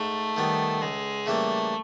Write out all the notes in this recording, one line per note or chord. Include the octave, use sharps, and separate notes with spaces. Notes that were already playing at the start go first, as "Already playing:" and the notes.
Already playing: G#2 A3
D#3 G3 B3
C#2 G#3
C#3 E3 G3 A3 A#3